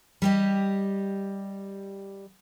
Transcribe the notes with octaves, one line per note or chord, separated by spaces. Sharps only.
G3 G4 D#5